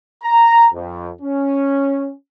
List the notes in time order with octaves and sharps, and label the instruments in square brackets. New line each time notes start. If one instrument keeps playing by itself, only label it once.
[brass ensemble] A#5
F2
C#4